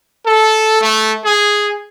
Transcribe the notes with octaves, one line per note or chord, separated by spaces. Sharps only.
A4
A3
G#4